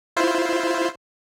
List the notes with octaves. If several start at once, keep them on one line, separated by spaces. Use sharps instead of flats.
E4 F4 C5